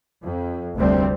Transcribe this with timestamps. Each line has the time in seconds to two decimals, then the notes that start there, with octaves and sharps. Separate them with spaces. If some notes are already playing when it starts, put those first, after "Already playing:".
0.23 F2
0.76 F1 D2 G3 C4